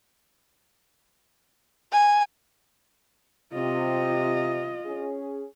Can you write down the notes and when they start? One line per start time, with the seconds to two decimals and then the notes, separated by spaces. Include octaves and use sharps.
1.92 G#5
3.53 C3 F4 D#5
4.86 C#4 G#4